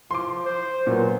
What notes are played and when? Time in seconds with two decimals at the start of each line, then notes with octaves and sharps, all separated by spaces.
0.11 F3 C6 D6
0.46 C5
0.87 A#2 F#3 B3